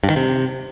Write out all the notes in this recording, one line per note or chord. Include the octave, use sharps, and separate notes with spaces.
G2
D#3
C3